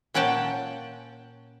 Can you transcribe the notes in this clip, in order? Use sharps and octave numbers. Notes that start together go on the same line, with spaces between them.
A#2 C#4 F#5 G5 A5